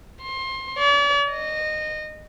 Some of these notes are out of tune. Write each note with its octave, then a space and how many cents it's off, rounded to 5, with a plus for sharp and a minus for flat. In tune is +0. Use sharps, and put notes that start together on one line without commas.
C6 +25
D5 -45
D#5 -20